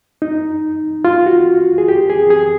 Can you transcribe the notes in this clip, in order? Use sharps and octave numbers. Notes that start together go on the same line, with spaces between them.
D#4
F4
F#4
G#4
G4
G#4
G#4